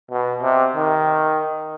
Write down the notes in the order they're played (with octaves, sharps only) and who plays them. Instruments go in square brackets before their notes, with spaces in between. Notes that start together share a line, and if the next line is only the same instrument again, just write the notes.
[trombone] B2
C3
D#3